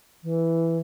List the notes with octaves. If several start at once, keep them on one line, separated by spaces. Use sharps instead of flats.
E3